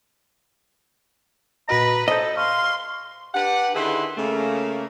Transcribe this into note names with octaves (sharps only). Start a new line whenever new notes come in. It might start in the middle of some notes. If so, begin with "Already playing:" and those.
A#2 F#4 B4 D#5 A#5
A4 C5 D#5 G6
F5 C6 C#6
D4 G4 B4 F#5
D3 D#3 E4 G#4 B4 C6
C#3 A3 A#3